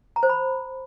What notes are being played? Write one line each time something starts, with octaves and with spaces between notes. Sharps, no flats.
A#5
C5
B5